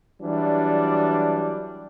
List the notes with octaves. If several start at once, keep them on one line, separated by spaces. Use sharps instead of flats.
E3 F#3 G3 D4